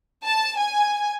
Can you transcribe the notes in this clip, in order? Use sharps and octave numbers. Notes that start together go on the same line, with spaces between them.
A5
G#5